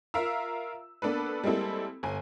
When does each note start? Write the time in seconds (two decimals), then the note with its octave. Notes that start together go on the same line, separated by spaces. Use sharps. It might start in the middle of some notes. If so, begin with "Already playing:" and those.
0.14 F4 A#4 E5 F5 A#5 E6
1.02 A#3 B3 D4 A4 B4
1.44 G3 G#3 A#3 C4 E4 A4
2.03 G1 G#5